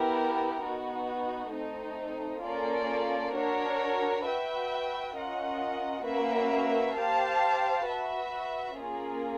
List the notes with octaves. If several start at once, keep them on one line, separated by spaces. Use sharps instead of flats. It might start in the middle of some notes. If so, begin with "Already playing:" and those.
Already playing: B3 E4 G4 A#4
B3 D#4 F#4
A3 C4 D#4
A#3 C#4 F4 A4 D5
D4 F#4 A#4 C#5
F#4 B4 E5 G5
C#4 F4 A#4 D#5 F#5
A#3 C#4 F#4 B4 E5
G4 C5 F5 A5
F#4 B4 E5
A#3 C#4 F4 G#4